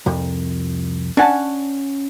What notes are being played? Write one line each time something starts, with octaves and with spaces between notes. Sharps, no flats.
C2 F2
C#4 D4 F#5 G#5 A5